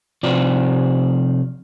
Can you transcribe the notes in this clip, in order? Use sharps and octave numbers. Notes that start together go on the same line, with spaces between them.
C3 F3 D5